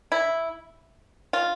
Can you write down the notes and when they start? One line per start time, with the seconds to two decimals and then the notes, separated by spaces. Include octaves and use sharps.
0.12 E4
1.33 F4